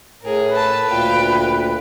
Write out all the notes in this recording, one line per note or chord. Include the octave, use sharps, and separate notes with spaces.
A2 G#4 A#4
A4 B4 A5
D2 A#2 F5 G5